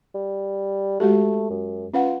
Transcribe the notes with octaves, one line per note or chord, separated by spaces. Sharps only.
G3
G#3 A3 F#4 G4
F#2
C#4 F4 B4 F#5